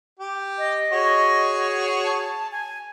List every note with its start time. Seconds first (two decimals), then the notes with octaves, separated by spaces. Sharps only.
0.19 G4
0.58 D#5
0.92 F#4 G#4 C#5
2.04 A5
2.52 G#5